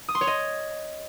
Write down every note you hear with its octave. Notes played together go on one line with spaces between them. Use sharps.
D#6
C6
C#5
D#5